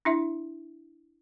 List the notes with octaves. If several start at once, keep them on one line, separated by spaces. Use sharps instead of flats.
D4 E4 E5